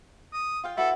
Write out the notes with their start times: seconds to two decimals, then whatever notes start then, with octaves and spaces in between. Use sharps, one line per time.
0.33 D#6
0.64 F4 F5 G5
0.77 E4 F#4 A4 B4